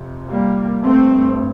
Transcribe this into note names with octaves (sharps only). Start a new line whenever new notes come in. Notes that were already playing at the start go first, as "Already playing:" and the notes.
Already playing: F2 C3
G3 A#3
G2 A3 C4